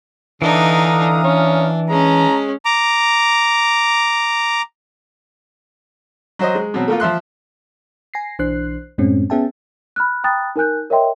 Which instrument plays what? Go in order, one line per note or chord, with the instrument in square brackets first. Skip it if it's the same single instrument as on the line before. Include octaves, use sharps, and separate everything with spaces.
[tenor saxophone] D3 [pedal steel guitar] E3 [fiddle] D4 D#4 [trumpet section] F5 A#5 D#6
[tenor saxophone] C#4 [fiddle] D4
[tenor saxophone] G#3 [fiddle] C#4 [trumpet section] A5 A#5
[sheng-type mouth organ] A#5 D6
[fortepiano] F#3 C5 D#5
G#3
B2 F#3 C4
A3 A#3 F4
F3 E5 C6 F#6
[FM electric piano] G#5 A#6 C7
B1 E3 D4 C5 F#6 C7
F#2 A2 G#3 C4 C#4
B3 C#4 G#4 E5 G5 A5
[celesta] B5 F6 F#6
G5 A#5 B5 D#6 F#6 A6
D#4 A#4 G#5 F#6 G6
A#4 C#5 D#5 E5 G5 C6